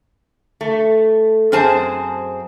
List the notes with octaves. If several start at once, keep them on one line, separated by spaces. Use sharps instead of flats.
A3
F#2 C4 G#4 C5 G#5 A5